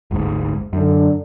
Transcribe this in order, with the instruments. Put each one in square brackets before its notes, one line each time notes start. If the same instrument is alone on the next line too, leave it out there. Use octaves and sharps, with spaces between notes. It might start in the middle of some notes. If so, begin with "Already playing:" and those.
[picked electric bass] G1 D2 G#2
[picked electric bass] F#2 [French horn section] D3 D4